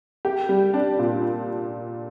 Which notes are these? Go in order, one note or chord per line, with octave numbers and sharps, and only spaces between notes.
G4
G3
D4
A#2